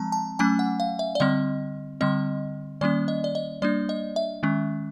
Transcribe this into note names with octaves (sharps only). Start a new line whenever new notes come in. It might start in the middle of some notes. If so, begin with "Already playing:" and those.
Already playing: F3 G#3 C4 A5 A#5
A5
F#3 A3 C#4 G#5
F#5
F5
E5
D5
D3 G3 C4 D#5
D3 G3 C4 D#5
D#3 G3 A#3 C#4 D5
D#5
D5
D#5
G3 A#3 D4 D5
D#5
E5
D#3 G#3 C#4